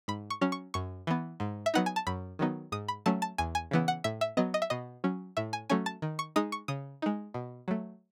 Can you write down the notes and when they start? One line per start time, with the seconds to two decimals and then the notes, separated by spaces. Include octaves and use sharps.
0.08 G#2 B5
0.30 C#6
0.41 F#3 C#4
0.52 C#6
0.74 F#2 C#6
1.07 E3 B3
1.40 G#2
1.66 E5
1.74 F#3 B3 D#4 F#5
1.86 G#5
1.96 A5
2.07 F#2 B5
2.39 D#3 F#3 B3 D#4
2.72 G#2 D#6
2.88 B5
3.06 F#3 A3 C#4 A5
3.22 A5
3.38 E2 G#5
3.55 G#5
3.71 C#3 E3 B3
3.88 F#5
4.04 A2 E5
4.21 E5
4.37 F#3 B3 D#5
4.54 D#5
4.62 E5
4.70 B2 D#5
5.04 F#3 C#4
5.37 A2 E5
5.53 G#5
5.70 F#3 A3 C#4 G#5
5.86 A5
6.02 D#3
6.19 C#6
6.36 G#3 D#4 D#6
6.52 C#6
6.68 C#3 D#6
7.02 G#3 D#4
7.34 B2
7.68 F#3 A3